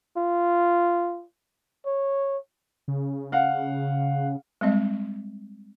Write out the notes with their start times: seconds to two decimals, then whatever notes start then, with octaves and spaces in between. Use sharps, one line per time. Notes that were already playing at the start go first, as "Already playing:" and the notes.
0.17 F4
1.86 C#5
2.88 C#3
3.32 F5 F#5
4.61 G3 G#3 C4 D#5